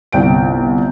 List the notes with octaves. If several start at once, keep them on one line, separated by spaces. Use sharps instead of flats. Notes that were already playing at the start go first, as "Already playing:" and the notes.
G1 C2 G5 D7